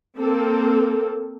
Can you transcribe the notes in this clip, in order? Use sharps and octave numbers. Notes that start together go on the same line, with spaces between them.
A#3 C4 A4